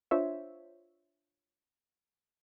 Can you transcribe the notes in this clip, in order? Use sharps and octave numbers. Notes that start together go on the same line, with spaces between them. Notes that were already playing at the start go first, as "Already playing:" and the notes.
D4 F4 C5 C#5 E5